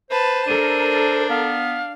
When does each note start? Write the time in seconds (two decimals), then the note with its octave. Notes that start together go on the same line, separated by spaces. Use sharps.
0.10 B4 C5 A5
0.47 D4 A4 A#4 D#7
1.29 B3 F5